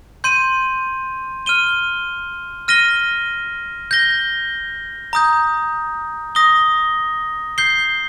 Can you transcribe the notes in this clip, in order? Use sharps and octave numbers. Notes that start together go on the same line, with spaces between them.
C6 G6 D#7
F6 D#7 G7
F6 A#6 D#7 G7
G6 A#6 G7
A#5 D#6 G6
D#6 A#6 G7
G6 C7 G7